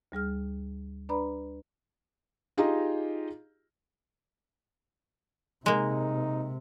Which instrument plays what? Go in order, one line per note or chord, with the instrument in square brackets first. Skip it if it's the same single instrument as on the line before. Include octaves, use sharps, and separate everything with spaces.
[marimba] D2 G3 G#4 F6
D4 B4 D5 A#5 B5
[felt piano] D#4 F4 G4 G#4 D#5 A#5
[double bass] C3 [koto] G#3 A#3 [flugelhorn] D#4